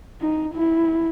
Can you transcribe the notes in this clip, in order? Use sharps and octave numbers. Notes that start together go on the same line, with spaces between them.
D#4
E4